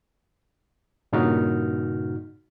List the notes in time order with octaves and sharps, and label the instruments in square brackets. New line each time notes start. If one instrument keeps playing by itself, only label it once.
[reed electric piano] G2 A#2 C#3 D#4 F#4 F6